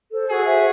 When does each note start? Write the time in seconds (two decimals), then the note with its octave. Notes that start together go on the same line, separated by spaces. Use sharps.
0.11 A4 C5
0.29 F#4 G#4 A4
0.46 C5 E5